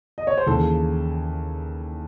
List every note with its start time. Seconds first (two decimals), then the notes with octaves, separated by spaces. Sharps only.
0.18 D#5
0.27 C#5
0.38 C5
0.47 D#2 C#3 E3 A4